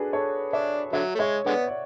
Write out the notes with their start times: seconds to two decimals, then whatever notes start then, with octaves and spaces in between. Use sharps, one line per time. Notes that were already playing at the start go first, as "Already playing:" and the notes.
Already playing: D4 F#4 G#4 A4 B4
0.13 A4 C#5
0.53 D4 C#5 E5
0.93 D3 F#3 C#5 E5
1.15 A3
1.19 G#3 C#5 E5
1.46 D3 G#3 B3 D5 F#5
1.68 D5